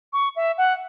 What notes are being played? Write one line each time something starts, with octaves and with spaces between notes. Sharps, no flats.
C#6
E5
F#5